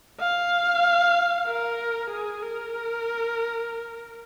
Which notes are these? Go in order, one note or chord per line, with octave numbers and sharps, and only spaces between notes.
F5
A#4
G#4
A#4